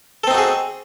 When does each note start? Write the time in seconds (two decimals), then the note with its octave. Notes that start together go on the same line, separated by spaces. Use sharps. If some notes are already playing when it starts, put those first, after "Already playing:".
0.24 A4
0.27 C4
0.31 D#4
0.34 F#4
0.38 G#4